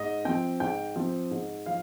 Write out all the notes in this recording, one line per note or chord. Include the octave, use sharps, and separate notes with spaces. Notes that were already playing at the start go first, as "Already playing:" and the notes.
Already playing: G#2 D#5
F3 C4 G5
G#2 G5
F3 C4
G#2
F3 F5